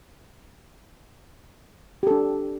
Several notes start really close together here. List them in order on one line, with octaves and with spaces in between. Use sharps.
G4 A4 D4